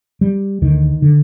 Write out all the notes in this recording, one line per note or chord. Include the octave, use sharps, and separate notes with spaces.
G3
D2 D3 D#3
D3